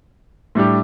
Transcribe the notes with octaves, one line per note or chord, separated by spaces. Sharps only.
A2 G3 D4 G4